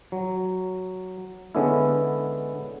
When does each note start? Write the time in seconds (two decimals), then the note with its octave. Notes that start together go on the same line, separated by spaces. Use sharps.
0.12 F#3
1.55 D3 G#3 B3 C#4 D4 E4